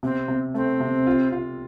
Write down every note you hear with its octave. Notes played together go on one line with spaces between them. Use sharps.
C3 C4
C3
A3 C4
C3
F4
F4